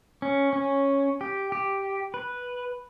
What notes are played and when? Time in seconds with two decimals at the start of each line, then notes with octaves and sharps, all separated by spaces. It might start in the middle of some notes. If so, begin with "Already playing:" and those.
0.22 C#4
0.53 C#4
1.21 G4
1.52 G4
2.14 B4